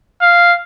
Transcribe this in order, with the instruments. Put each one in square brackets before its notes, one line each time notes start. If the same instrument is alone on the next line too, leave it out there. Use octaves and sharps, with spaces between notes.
[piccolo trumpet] F5